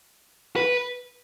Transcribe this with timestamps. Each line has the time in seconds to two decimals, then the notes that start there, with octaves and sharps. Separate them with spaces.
0.56 B4